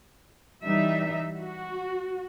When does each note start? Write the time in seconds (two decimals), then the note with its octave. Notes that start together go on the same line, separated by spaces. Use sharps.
0.63 E3 G3 D#4 E5
1.37 F#4